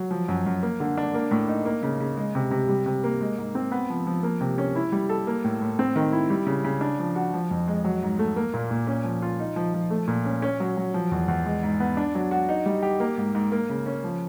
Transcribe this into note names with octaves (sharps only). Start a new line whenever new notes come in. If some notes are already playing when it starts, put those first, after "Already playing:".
Already playing: F#3
F3
F#2
F#2
A#3
D3
D4
A#3
A2
D#4
A#3
C#3
C#3
G#3
C3
C3
G3
C3
A#3
G#3
G#2
C4
B3
F3
F3
A#3
C3
C#4
E4
G3
A4
A#3
A2
A2
C4
D#3
E4
G3
C#3
C#3
D4
F3
F#4
F3
F2
G#3
F#3
G#2
A3
A#3
A#2
A#2
C#4
F3
F4
D#4
F3
F3
A3
A#2
C#4
C#4
F#3
F#3
F3
E2
E2
G#3
G#2
B3
D4
F#3
F#4
D#4
G3
G4
A#3
G#2
G#2
A#3
C#3
C#4
F3